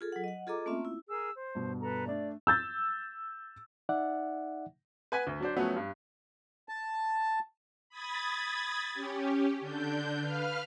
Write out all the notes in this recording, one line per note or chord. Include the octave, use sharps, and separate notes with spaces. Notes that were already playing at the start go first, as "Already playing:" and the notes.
F4 G#4 A4
F#3 F#5
D#5 F#5
F4 G#4 A4 D#5 A#5 D6
A3 A#3 C4 C#4 F4 E5
E4
G#4 A#4 E6
C5
G2 B2
A4 B4 A#5
A3 D4 D5
E6 G6 A6
D#4 D5 E5 F#5
B4 F#5 G#5 B5 G#6 B6
D2
F#3 D4 C5
F3 F#3 A3 B3 C#4 B4
G2
A5
B5 D#6 G#6 A6
C#4 G4
D3 D4 G6
B4 F5 F6